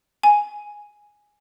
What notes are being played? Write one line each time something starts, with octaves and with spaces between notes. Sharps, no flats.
G#5